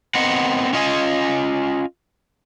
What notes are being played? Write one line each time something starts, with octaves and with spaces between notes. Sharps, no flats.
B3 C4 A#4 D#5 F#5
C#4 F4 D#5 F#5 G#5